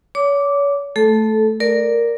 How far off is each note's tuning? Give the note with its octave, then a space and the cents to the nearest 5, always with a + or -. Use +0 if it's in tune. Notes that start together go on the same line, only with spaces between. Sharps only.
C#5 +35 D6 -10
A3 +0 A4 -15
A#4 +0 D5 +0